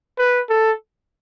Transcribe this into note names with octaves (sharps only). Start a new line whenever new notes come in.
B4
A4